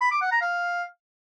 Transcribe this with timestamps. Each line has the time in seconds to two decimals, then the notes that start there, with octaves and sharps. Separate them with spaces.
0.02 B5
0.12 D6
0.22 F#5
0.32 A#5
0.42 F5